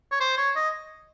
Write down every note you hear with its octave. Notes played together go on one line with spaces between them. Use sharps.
C#5
C5
C#5
D#5